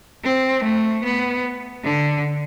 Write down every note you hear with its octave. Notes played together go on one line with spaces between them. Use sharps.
C4
A3
B3
D3